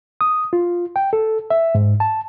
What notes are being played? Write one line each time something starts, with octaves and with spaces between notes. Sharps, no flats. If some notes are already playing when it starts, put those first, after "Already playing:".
D#6
F4
G5
A4
E5
G#2
A5